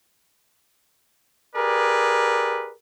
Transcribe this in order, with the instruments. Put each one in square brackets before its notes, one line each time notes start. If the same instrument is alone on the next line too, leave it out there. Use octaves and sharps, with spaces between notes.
[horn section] G4 G#4 A#4 B4 D5